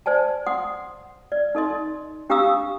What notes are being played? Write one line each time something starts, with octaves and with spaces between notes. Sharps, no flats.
C5 D5 G#5 A5
F#5 C6 D#6
D5
D#4 A4 D#5 C6
D4 G4 F5 A#5 D#6 E6